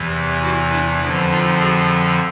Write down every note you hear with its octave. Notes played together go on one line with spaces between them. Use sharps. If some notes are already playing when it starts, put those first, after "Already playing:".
Already playing: E2 C3 E3
E4 F#4
D4 E4
F2 D3 F3 D4 E4
D#4 F4
F#4 G#4